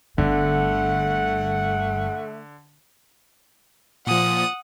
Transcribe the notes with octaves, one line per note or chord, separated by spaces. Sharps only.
G1 G2 D3 A3 F#5
A#2 F3 F#5 D#6